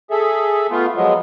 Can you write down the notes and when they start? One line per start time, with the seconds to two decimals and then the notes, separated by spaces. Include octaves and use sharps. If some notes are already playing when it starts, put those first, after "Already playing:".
0.11 G#4 A4 E5
0.71 A3 B3 F4
0.96 F3 F#3 G#3 B3